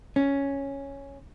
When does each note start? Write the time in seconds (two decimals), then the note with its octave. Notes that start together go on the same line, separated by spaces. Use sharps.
0.16 C#4